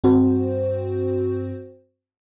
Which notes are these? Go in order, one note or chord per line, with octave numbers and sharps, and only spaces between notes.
G2 C4 F#4 C5